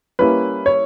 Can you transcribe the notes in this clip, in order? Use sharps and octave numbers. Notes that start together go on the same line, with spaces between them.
G3 A#3 C#4 E4 B4
C#5